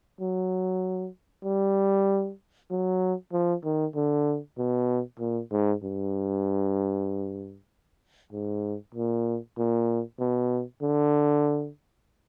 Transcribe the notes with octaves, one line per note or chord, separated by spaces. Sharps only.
F#3
G3
F#3
F3
D#3
D3
B2
A#2
G#2
G2
G#2
A#2
A#2
B2
D3